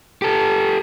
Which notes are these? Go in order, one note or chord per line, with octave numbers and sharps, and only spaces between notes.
G4 A4